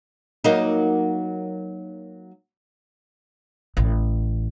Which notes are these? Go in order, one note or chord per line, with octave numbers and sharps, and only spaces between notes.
F#3 A#3 D#4
A1